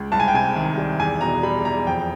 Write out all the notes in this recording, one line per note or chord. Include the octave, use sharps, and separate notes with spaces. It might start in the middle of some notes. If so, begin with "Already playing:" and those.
Already playing: C#2
C2 A5
G#5
G5
C3 G#5
D#3
G3
E2 G#5
B2 A#5
G3 B5
E2 A#5
F2 G5